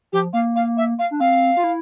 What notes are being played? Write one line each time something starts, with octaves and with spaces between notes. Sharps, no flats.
F3 G4
A#3 F5
F5
E5
F5
D4
C4 F5
F4
E4